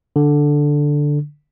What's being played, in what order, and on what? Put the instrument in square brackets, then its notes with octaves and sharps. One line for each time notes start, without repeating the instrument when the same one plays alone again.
[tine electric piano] D3